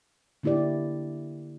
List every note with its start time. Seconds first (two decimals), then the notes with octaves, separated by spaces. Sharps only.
0.43 D3 A#3 E4 G4 D5